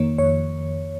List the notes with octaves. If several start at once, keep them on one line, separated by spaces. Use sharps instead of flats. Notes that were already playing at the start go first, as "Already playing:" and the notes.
Already playing: F2 D#3 A#3 C#5
F2 C#5